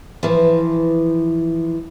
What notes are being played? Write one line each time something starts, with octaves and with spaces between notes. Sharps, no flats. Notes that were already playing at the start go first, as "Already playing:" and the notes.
E3 F3